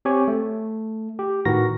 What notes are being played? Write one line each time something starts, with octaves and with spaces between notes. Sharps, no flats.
C4 G4 C#5 G#5
A3
G4
A2 D#3 F#4 A#4 B4 A#6